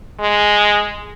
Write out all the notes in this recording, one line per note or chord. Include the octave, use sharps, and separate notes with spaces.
G#3